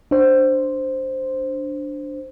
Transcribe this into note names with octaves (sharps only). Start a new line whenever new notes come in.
D4 C5